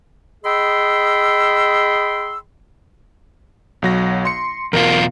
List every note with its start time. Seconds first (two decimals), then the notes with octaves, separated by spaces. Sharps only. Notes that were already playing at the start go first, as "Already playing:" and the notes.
0.44 G#4 D#5 G5 B5 C6 E6
3.82 B1 F#3 A#6
4.25 C6 C#7
4.73 E2 B2 F4 A#4